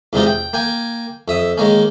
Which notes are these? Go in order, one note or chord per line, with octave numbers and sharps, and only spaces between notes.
E2 G2 C3 G#3 D#4 F4
G5
A#3 G5 G#5
F2 E5 D#6
D#3 G#3 A#3 C#4